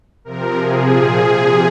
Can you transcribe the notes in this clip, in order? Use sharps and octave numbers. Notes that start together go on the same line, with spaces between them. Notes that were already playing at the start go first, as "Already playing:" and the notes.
C3 F3 A#4
C3 F3 G#4
A#2 F3 G#4
C3 F3